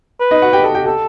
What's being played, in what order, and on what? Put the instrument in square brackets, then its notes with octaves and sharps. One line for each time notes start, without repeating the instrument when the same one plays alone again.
[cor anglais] B4
[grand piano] D#4 D#5
F#4 F#5
G4 G5
A4 A5
G4 G5
[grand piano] G4 G5 [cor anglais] A4